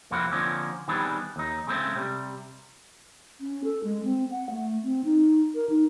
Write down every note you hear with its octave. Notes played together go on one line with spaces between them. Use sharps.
C2 F2 A#3 C4 E4 F#5
D3 F3 A#3 C4 C#4
D#3 G3 B3 C4 D4 G#4
D#2 D#4
C#3 G#3 A3 C4 C#4
C3 G3
C#4
A4
G#3
C4
F#5
A3
C4
D#4
A#4
D#4